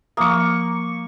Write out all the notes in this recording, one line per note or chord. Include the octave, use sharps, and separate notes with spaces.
F3 A#3 C#6 D#6